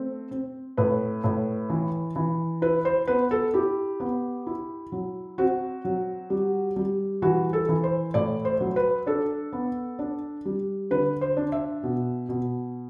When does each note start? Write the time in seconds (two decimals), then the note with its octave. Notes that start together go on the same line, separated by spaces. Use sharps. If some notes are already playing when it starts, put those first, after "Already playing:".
Already playing: A3 C4
0.31 C4
0.77 A2 B4
1.24 A2
1.70 E3
2.16 E3
2.62 E4 B4
2.85 C5
3.07 B3 B4
3.31 A4
3.54 E4 G4
4.00 B3
4.47 E4
4.92 F#3
5.38 C4 F#4
5.85 F#3
6.30 G3
6.76 G3
7.22 E3 F#4
7.53 A4
7.69 E3
7.84 C5
8.14 A2 D5
8.45 C5
8.60 F#3
8.76 B4
9.06 D4 A4
9.53 B3
9.99 D4
10.45 G3
10.90 D3 B4
11.21 C5
11.37 D4
11.52 E5
11.83 B2
12.29 B2